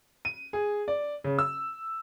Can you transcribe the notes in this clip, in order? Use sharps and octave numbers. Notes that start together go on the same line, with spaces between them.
D#7
G#4
D5
C#3
E6